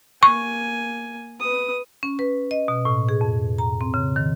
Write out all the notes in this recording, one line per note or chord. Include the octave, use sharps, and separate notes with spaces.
A#3 G#5 C#6
B4 D#6
C#4
B4
D#5
B2
A2
G#4
F2
A#5
C4
C#3
D#3